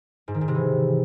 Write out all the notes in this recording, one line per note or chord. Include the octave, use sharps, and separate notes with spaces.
G#2
D#3
G#2
C3
E3